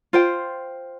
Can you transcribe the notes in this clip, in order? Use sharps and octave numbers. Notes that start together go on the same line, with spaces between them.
F4 C5 G5